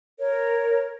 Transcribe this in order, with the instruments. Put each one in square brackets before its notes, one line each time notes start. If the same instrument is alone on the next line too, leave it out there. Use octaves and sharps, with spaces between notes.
[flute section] A#4 C#5